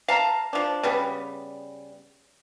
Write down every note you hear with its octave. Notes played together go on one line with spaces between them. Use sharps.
F5 A5 A#5
F3 D4
C#3 G3 B3